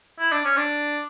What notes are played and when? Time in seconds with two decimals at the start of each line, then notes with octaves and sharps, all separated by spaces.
0.20 E4
0.32 D4
0.45 C#4
0.57 D4